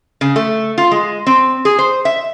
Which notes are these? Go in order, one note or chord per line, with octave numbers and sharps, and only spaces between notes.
C#3
A3
F4
G#3
C4
G#4
C5
E5